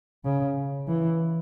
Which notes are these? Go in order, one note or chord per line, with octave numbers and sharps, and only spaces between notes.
C#3
E3